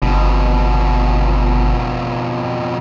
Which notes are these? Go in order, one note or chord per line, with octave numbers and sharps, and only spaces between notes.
G1 F2 B2